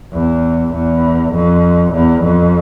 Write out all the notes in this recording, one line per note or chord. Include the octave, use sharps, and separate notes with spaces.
E2
E2
F2
E2
F2